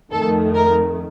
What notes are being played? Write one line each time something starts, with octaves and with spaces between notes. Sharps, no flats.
F2 D#3 A3 A4
A#4